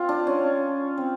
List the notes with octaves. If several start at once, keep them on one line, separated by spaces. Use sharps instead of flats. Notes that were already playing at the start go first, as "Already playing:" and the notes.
Already playing: C4 F4
D4
C#4
C4